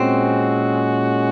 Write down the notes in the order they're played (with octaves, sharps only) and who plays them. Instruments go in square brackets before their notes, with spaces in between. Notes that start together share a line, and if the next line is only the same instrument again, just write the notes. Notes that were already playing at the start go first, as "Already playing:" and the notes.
Already playing: [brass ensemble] A#2 G#3 C#4 F#4 [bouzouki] C4